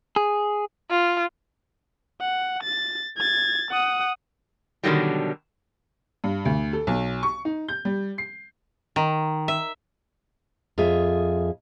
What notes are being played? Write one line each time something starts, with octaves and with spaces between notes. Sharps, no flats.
G#4
F4
F#5
A6
G#6 A6
F#5 D#6
B2 D3 D#3 F#3 G3
G2
D2
A4
B1
C#6
D#4
G6
G3
C7
D#3
E5
F2 F4 G#4 E5